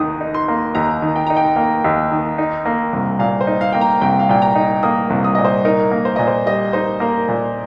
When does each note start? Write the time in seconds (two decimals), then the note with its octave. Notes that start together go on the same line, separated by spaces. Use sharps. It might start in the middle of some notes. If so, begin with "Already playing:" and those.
Already playing: D#2 D#3 A#5 D#6
0.21 D#4
0.34 C6
0.48 A#3
0.75 D#2 A#5
1.02 D#3
1.16 G5
1.27 D#4 A#5
1.37 G5
1.56 A#3
1.84 D#2
2.12 D#3
2.38 D#4
2.66 A#3
2.93 C2
3.19 A#2 F5
3.41 C5
3.47 D#4
3.61 F5
3.72 A#3 G5
3.81 A#5
4.01 C2 G5
4.19 F5
4.29 A#2 G5
4.42 A#5
4.55 D#4
4.83 A#3 D#6
5.10 C2
5.24 D#6
5.35 A#2 D#5
5.45 C5
5.65 D#4 A#4
5.91 A#3
6.05 C5
6.16 A#2 D#5
6.27 C5
6.46 G3 D#5
6.73 D#4 C5
7.00 A#3 A#4
7.29 A#2